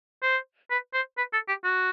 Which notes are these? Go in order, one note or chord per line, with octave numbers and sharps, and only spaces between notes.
C5
B4
C5
B4
A4
G4
F#4